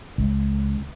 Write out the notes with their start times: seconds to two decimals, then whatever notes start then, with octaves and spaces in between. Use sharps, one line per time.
0.18 C#2